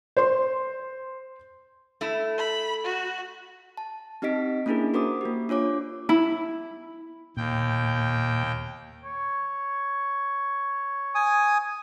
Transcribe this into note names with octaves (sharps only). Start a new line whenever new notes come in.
C5 C6
A3 E4
B5
F#4
A5
C4 D#4 G4 D#5 B6 D7
A#3 C#4 D4 E4 G#4 A#4
F#4 A#4 C5 D6 D#6
A#3 G4
D4 F4 C#5 D6
E4
D#2 A#2 G5
C#5
G#5 D#6